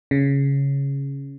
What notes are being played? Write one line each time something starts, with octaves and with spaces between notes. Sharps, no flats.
C#3